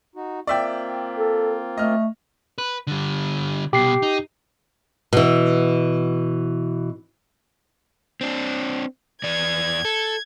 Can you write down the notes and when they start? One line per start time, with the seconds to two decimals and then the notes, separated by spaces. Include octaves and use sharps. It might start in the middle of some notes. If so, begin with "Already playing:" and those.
0.15 D#4 F#4
0.47 A#3 C4 F4 D5 E5 G5
1.18 A4
1.77 A3 D#5 F6
2.58 B4
2.87 D3 G3
3.73 C2 B2 G4 C7
4.02 D#4
5.13 B2 E3
8.21 C4 D4
9.24 E2 E3 D5 G#6
9.85 A4